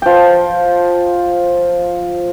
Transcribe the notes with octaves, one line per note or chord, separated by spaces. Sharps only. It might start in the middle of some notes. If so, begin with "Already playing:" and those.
F3 G5